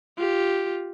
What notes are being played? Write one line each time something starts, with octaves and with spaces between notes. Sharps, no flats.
F4 G4